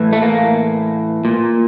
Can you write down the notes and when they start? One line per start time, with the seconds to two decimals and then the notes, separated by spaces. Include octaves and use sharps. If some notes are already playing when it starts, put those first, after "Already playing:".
Already playing: A2 E3
0.13 A3
0.22 A#3
1.25 A#2